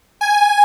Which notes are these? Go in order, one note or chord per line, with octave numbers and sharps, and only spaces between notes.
G#5